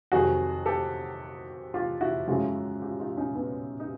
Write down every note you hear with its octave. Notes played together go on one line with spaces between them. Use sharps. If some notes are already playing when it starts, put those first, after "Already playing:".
F2 C3 D#3 F#3 F#4 G#4
G4 A4
F4 G4
E4 F#4
F#2 C#3 F3 G#3 E4 F#4
F4 G4
D#4 F4
C#4 D#4
B3 C#4
D#4